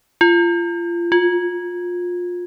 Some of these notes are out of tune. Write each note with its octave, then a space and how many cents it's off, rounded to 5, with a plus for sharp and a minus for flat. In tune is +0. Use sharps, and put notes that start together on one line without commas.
F4 -25
F4 +25